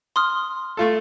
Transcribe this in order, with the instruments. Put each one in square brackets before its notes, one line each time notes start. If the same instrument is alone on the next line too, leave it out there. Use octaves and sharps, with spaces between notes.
[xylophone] C6 D#6 F6
[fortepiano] A3 F4 A4